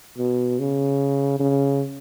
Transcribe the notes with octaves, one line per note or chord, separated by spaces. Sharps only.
B2
C#3
C#3